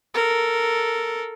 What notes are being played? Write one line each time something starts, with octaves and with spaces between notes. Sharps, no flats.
A4 A#4